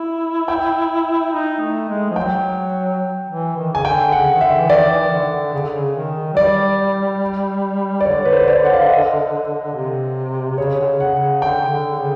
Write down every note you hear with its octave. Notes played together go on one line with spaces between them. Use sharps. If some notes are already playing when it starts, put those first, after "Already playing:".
Already playing: E4
G5
D#4
A3
G#3
F3
F#3 G5
E3
D#3
C#3 G#5
D3 G5
D3
C#3 F#5
D#3
D3 E5
E3
D#3 D5
E3
D#3
D3
C#3
D3
C#3
D#3
F#3
G3 D5
D5
D3 C#5
B4
C5
C#5
D5
F#5
F5
E5
D#5
C3
C3
C#3 C#5
D3
C#3
F#5
C#3
D3 G5
C#3
D3
C#3